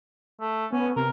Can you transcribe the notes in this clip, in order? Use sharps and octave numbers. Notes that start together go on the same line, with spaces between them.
A3
B3 C#4
C3 A#4